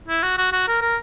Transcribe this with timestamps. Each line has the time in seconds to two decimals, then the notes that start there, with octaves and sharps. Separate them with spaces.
0.08 E4
0.23 F#4
0.38 F#4
0.52 F#4
0.68 A#4
0.81 A#4